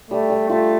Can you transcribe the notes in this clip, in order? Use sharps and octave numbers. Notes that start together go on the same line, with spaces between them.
G3 A3
G3
A3 F4